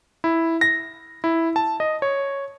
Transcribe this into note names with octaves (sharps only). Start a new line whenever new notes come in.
E4
A#6
E4
A5
D#5
C#5